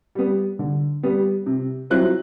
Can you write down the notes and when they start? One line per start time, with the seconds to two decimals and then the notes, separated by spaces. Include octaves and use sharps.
0.15 G3 B3
0.59 D3
1.03 G3 B3
1.46 C3
1.90 F#3 C4 E4 F#6